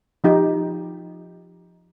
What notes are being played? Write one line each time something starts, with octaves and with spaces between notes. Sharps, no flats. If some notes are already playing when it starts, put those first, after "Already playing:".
F3 D#4 G4